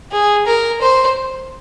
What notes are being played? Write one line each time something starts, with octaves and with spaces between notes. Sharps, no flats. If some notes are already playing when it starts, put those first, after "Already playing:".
G#4
A#4
C5